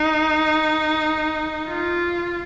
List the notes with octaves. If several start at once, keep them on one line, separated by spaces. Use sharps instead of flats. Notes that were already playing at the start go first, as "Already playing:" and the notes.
Already playing: D#4
F4